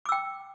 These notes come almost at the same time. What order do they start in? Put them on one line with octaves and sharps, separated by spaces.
D6 E6 G5